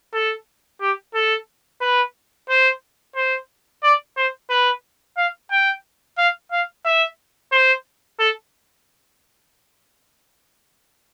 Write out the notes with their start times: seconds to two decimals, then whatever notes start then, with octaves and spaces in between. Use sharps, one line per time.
0.14 A4
0.81 G4
1.14 A4
1.81 B4
2.49 C5
3.16 C5
3.83 D5
4.17 C5
4.50 B4
5.17 F5
5.51 G5
6.18 F5
6.52 F5
6.85 E5
7.52 C5
8.19 A4